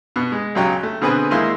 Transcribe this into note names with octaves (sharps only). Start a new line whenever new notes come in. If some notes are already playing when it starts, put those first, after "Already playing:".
B2 B3
G#3
B1 C#3 F#3 C#4 G5
A3
B2 D3 C4 G#4 B4
D#2 G#3 A#3 E4 C6